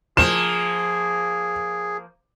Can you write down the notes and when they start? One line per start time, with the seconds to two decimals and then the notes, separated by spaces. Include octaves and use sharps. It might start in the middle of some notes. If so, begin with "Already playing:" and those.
0.17 F3 A#3 G#4 E7